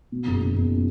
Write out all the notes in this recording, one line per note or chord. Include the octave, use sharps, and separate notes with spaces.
B2
F#1
B2
F#1